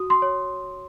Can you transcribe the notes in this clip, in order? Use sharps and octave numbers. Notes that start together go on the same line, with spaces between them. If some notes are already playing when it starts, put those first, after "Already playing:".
Already playing: F#4 D#6
C6
C#5